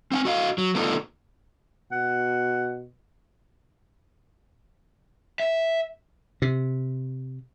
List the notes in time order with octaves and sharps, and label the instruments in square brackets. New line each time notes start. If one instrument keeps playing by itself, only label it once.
[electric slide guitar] C4 F#5 G#5
F#4 D#5 F5
F#3
A3 B3 D4 D#4 F4 A4
[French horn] B2 [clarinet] F#5
[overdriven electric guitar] E5
[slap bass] C3